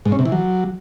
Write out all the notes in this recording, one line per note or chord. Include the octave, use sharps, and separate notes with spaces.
G#2
C#4
C3
E3
F#3